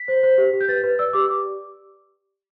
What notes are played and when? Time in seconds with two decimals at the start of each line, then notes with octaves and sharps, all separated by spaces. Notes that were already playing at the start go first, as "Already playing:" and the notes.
Already playing: B6
0.08 C5
0.23 C5
0.38 G4
0.53 G4
0.61 G6
0.68 B4 A6
0.83 B4
0.99 D5 E6
1.13 G4 D6